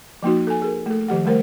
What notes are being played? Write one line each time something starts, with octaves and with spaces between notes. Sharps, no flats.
F3 A#3 D#4 F#4
A4 G#5
G#4 A#4
A3 A4
D#3 F3 G4 F#5
G3 A3 A#4 C5